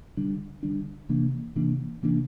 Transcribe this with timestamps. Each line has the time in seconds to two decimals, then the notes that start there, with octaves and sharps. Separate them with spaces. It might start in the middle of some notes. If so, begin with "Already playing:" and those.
0.17 D3 G3 D4
0.63 D3 G3 D4
1.09 C3 E3 A#3 D4
1.56 C3 E3 A#3 D4
2.03 C3 E3 A#3 D4